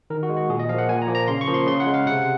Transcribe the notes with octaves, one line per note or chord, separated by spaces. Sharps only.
D#3 A#4
F#4
G#3
F#4
A#2 G#4
D#5
F3 A#3 F5
F#5
A#2 G#5
A#5
F3 A#3
A#5
C#3 C6
C#6
F3 A#3
C6
C#3 C6
F#5
G#3
F5
C3 F#5